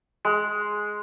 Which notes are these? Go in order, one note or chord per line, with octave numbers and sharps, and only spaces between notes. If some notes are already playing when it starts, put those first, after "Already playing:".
G#3